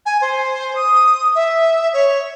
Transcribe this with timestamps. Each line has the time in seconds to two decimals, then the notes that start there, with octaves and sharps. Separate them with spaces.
0.06 G#5
0.21 C5
0.75 D#6
1.35 E5
1.93 C#5